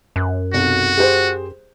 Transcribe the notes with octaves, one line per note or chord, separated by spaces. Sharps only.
F#2 F#6
B1 C3 F#4
G4 G#4 C5